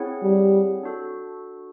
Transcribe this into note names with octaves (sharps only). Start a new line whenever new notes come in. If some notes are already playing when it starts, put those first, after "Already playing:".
Already playing: C4 E4 G#4 C#5 F#5
G3
D4 F#4 A4